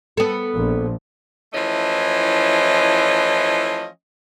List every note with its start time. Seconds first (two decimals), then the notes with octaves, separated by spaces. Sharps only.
0.17 B3 A4
0.55 A#1
1.53 E3 F3 A3 C#4 E4 D#5